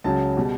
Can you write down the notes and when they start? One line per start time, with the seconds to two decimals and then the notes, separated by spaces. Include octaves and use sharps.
0.04 C#2 C#3 F#3 A5
0.37 B2 G3